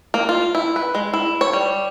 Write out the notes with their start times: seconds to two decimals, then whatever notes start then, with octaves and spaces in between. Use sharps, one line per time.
0.14 A#3
0.29 F4
0.55 E4
0.76 B4
0.95 G#3
1.13 E4
1.41 C#5
1.53 G3